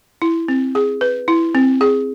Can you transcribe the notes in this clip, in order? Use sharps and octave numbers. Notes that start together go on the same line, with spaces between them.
E4
C4
G#4
B4
E4
C4
G#4